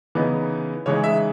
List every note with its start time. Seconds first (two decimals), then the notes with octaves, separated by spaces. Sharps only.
0.15 C#3 E3 B3 D#4
0.86 C#3 E3 G#3 D#4 C#5
1.04 E5